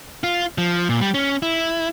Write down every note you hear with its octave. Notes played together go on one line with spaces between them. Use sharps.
F4
F3
A#2
G3
C#4
E4